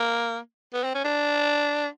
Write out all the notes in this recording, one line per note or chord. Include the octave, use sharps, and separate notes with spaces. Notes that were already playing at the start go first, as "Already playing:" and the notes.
Already playing: A#3
B3
C4
C#4
D4